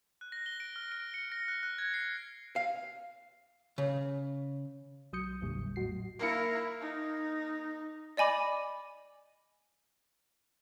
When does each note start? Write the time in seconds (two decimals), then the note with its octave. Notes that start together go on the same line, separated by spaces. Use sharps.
0.21 F#6
0.32 A#6
0.46 G7
0.60 D7
0.76 F6
0.92 D7
1.14 C#7
1.32 A#6
1.48 F#6
1.63 F#6
1.78 G#6
1.94 C7
2.56 F5
3.78 C#3
5.13 B1 F#3 D#6 G6 C#7
5.41 A1 E2 A#2 D3 G3
5.76 A2 F#3 F#4 C7
6.19 A#3 E4 F5 A#5 C#7
6.80 D#4
8.17 D5 D#5 G#5 B5 D6